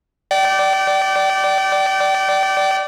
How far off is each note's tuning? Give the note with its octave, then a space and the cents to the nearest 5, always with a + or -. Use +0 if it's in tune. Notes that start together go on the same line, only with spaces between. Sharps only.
D5 +0 G5 -35